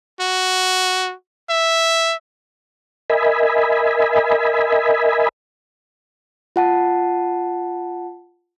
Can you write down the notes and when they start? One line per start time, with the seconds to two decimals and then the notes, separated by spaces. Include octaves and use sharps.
0.20 F#4
1.50 E5
3.10 A#4 D#5 E5 G#5 B5
6.56 F4 F#5 A5